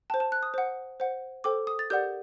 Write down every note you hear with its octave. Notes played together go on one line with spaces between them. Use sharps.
C5 G5 A5
A5
F#6
D#6
C5 F#5
C5 F#5
A4 C5 G5 D6
D#6
A6
G4 A#4 D5 F#5 G6